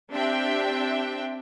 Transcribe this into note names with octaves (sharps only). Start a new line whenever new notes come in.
C4 D4 G4 E5 G5